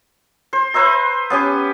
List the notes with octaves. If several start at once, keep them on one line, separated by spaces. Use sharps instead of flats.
C5
B4 C5 E5 A#5
B3 C#4 G4